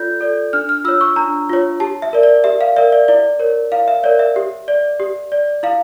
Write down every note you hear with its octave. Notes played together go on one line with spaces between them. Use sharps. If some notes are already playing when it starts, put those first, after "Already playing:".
Already playing: F4 A4 D5 G6
A4 D5
D4 F6
F6
F4 C#5 E6
C#6
D4 A#5
F4 C#5
G4 A5
E5
A#4 D5
D5
G4 E5
F5
A#4 D5 E5
D5
E4 D5
A#4 C#5
E4 F5
E5
A#4 C#5 D5
E5
G4
D5
G4
D5
E4 F5